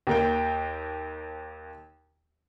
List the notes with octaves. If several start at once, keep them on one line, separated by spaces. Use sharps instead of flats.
D#2 A#3 G5